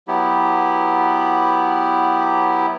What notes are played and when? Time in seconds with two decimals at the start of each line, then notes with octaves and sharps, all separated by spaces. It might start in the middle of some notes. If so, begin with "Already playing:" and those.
0.08 F#3 B3 E4 G4